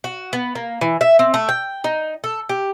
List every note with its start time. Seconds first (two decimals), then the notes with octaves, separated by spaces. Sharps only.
0.04 F#4
0.33 B3
0.55 A#3
0.81 E3
1.01 E5
1.19 C4
1.34 A3
1.49 G5
1.84 D#4
2.24 A4
2.49 G4